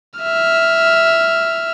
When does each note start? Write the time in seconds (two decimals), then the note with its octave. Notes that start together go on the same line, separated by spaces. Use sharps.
0.19 E5 F6